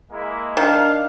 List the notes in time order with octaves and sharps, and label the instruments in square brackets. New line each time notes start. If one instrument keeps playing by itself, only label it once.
[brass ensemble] G#3 A#3 E4
[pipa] D#3 [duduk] D4 [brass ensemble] F5